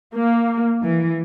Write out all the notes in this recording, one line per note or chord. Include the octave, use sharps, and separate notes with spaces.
A#3
E3